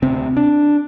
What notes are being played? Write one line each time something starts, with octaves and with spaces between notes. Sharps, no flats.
D2 C3 C4
D4